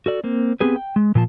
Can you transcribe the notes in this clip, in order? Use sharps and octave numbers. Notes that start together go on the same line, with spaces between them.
F#4 A4 D5
A#3 C4
B3 C4 G4 G#4 B4
G5
G#3
A#2 F3 F4 A5